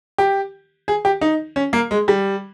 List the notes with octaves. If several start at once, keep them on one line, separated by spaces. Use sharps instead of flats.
G4
G#4
G4
D#4
C#4
A#3
G#3
G3